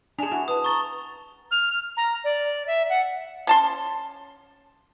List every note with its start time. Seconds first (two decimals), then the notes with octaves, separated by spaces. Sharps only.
0.19 D4 G#4 G#5 E7 F7
0.32 E4 F#4
0.48 B4 A5 D#6
0.64 A#5 C#6 A6 G7
1.51 F6
1.97 A#5
2.24 D5
2.67 E5
2.89 F#5
3.47 C#4 A5 C6